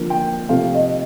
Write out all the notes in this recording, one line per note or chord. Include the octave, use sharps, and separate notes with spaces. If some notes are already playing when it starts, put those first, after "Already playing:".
Already playing: D3 F3 A#3
G5
C3 F3 A3 C4 F5
D#5